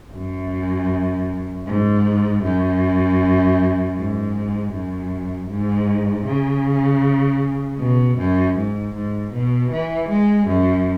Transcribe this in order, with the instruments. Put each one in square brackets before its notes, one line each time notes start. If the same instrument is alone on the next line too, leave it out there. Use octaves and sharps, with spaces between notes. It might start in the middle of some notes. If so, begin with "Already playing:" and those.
[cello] F#2
G#2
F#2
G#2
F#2
G#2
C#3
B2
F#2
G#2
G#2
B2
E3
G#3
F#2